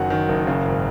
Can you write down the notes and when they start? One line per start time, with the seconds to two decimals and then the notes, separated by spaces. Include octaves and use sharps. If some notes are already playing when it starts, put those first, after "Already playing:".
Already playing: F#1 F#2 D#3 F#3 F#5 G#5
0.10 D#3
0.28 F#1
0.47 C#3
0.66 G#1